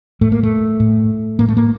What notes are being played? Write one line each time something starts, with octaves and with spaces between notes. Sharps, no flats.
A2 A3
A#3
A3
A2
A2 A#3
A3
A#3